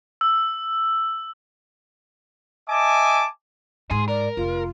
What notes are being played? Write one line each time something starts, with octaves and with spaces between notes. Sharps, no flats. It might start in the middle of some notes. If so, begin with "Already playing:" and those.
E6
D#5 E5 G#5 A5 D6
G#2 G#4 C6
A#4 D5
F1 F4